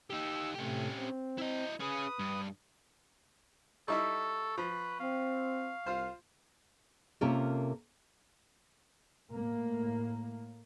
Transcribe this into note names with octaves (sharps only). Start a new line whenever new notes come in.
D#4 G4 E6
A2 C3 A3 C#4 G4
C4
E4 D#5
C#4 G#4 B4 D#6
G2
G3 D#4 E4 A4 C#6
F3 B4
C4 F5
C2 F4 C5
C3 A#3 C#4 F4 A4 A#4
A2 A#3